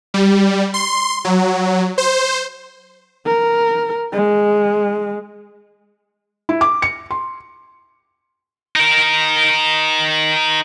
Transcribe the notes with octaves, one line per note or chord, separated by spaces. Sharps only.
G3
C6
F#3
C5
A#4
G#3
E4
D6
C#7
C6
D#4 A#4